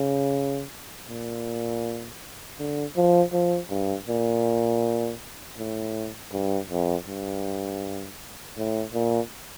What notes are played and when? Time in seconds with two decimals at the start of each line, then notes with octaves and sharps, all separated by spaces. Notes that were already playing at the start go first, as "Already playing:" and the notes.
Already playing: C#3
1.08 A#2
2.59 D3
2.96 F3
3.33 F3
3.70 G2
4.08 A#2
5.58 A2
6.33 G2
6.69 F2
7.07 G2
8.57 A2
8.94 A#2